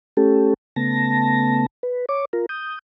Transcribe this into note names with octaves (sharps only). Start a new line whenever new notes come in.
A3 C#4 G4 A4
C#3 A3 B3 A5 A#6
B4
C#5 D6
F4 A#4
D#6 G6